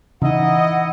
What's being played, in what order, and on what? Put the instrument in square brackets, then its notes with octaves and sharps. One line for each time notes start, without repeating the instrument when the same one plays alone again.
[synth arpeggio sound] C#3 [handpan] E3 D#4 [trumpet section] E4 D#5 [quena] F#5